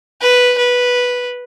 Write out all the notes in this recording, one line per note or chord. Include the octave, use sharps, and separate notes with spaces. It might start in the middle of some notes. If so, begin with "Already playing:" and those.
B4
B4